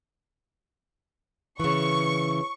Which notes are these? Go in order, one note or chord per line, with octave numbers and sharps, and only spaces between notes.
C#3 E3 C#6